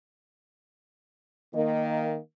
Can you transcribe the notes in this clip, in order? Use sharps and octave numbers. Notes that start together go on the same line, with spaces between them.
D#3 A#3 D#5